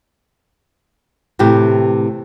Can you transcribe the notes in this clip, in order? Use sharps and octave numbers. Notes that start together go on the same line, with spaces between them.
A2 C3 E3 G4